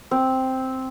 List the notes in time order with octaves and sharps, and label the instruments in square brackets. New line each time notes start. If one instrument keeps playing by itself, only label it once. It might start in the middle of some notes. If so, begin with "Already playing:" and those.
[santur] C4